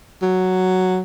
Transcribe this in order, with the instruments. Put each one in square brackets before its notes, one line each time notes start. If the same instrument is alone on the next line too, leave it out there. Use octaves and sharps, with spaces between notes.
[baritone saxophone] F#3